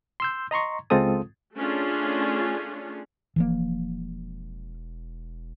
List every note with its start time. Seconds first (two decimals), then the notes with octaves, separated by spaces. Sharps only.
0.20 C6 E6 G6
0.51 D#5 A#5 C6 C#6
0.90 C#2 G#3 C4 F4 A4 D#6
1.55 A3 C#4 D4 F4 G#4
3.36 E1 E3 F3 A#3